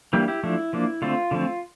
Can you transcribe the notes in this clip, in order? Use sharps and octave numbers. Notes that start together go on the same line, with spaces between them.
E3 G3 A#3 D4 E4 G4
E4 G4
F3 A3 D4 E4
F3 A#3 D4
D3 A3 C4 F4
D3 F3 A3 C4